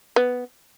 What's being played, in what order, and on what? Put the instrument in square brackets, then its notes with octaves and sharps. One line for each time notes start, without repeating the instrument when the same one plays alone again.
[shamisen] B3